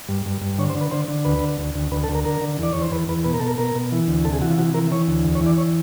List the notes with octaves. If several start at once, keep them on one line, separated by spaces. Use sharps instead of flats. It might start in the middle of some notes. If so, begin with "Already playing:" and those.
G2
G2
G2
D3 C#5
C5
D3
B4
D3 C5
D3
D2 B4
D3
D2
D2
D2 B4
A4
D2
A#4
D3 A#4
D3
E2 D5
E2 C#5
C5
E2 B4
E2 B4
B2 B4
A#4
B2 A4
A#4
B2 A#4
B2
E3
D2
C3 A4
G#4
E3 F#4
F4
C3 F#4
E3 A#4
E3 C#5
D2
E2
C#5
E3
D5
C#5